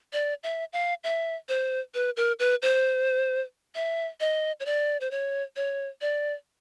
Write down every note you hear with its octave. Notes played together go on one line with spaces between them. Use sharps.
D5
E5
F5
E5
C5
B4
A#4
B4
C5
E5
D#5
C#5
D5
C5
C#5
C#5
D5